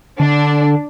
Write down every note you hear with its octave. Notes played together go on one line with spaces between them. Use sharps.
D3 D4